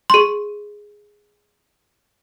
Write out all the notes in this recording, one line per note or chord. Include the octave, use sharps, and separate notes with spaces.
G#4 C6